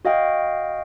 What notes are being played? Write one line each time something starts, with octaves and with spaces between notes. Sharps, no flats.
F#4 D#5 F5 G5